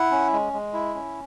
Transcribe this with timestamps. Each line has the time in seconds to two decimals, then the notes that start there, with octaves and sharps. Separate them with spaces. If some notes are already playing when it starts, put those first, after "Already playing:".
Already playing: E4 F#5
0.11 C#4
0.32 G#3
0.53 G#3
0.73 E4
0.95 C#4